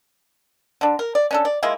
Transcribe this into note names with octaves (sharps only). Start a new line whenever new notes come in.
D3 D4
A#4
D5
C#4 D4 A4
D5
G#3 A#3 E4 F4